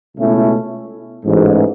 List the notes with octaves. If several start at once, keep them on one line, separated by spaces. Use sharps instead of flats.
C#2 B2 A3 C#4 E4
A1 G#2 E3